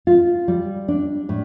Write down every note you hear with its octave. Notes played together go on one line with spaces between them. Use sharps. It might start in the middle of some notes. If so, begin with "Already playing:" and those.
F4
G3
D4
A2